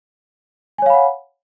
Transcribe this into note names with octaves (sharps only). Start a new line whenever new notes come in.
C#5 F5 F#5 G#5 B5